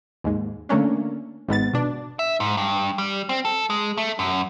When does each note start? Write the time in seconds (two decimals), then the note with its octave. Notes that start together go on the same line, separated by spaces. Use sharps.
0.24 D#2 G#2
0.69 D3 A3 A#3 C#4 D4
1.48 G#1 G#2 B3 A6
1.73 B2 D4
2.19 E5
2.40 G#2
2.57 G2
2.98 G3
3.29 C4
3.45 A4
3.70 G#3
3.98 A3
4.19 F#2